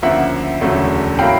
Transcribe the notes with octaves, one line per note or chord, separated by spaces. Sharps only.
D2 C#3 F3 A#3 E5 F#5
E1 D2 C#3 F#3 A3
A2 F#3 A#3 F5 G5